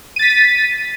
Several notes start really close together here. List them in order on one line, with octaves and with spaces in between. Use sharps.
D#7 A6 B6